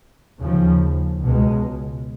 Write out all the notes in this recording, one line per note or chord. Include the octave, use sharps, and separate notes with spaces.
D#2 C#3 F3
C#2 B2 G#3